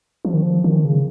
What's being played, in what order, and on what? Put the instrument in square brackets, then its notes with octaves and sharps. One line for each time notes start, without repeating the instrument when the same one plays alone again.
[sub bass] F3
D#3
F3
D#3
C#3